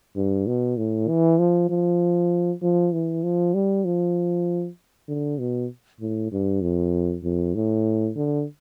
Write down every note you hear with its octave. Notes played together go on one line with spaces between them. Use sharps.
G2
B2
A2
E3
F3
F3
F3
E3
F3
G3
F3
D3
B2
A2
G2
F2
F2
A2
D3